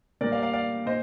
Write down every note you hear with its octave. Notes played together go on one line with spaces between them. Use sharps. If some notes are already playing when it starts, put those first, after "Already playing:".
A#2 G3 A#4 D5
D5 F5
D5 F5
D5 F5
A#2 C5 D#5